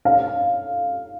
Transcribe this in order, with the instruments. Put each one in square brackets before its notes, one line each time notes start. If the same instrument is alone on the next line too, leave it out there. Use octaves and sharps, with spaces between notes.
[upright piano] F5